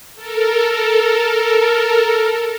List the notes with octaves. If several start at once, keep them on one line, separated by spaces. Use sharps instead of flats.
A4 A#4